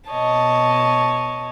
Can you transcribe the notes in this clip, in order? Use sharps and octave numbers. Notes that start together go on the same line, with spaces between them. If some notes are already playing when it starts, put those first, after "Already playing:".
B2 C#5 D#5 A5